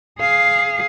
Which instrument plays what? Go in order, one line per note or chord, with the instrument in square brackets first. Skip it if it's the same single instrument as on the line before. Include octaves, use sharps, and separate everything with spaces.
[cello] G#4 F5